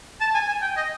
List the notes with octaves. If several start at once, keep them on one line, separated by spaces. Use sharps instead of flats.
A5
G#5
G#5
G5
D#5